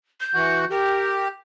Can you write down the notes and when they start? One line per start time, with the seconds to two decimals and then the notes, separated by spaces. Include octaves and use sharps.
0.21 G6
0.34 E3 F#4 F#5
0.71 G4 A#4